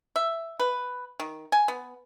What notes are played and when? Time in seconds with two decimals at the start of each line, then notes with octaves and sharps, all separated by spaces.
0.16 E5
0.60 B4
1.20 D#3
1.52 G#5
1.68 B3